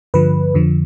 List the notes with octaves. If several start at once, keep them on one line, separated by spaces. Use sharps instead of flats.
G2 D3 F3 B4
F2 D3 F3